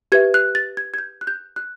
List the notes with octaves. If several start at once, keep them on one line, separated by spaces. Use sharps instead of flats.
G4 B4 E5 G#6
F#6
A6
G#6
G#6
G6
F#6
G6
F#6